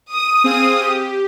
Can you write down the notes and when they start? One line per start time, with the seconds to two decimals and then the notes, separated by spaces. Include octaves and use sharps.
0.11 D#6
0.44 C4 G#4 F5
0.80 G4